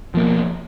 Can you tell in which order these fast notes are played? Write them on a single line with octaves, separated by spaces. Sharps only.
F3 A#3 B2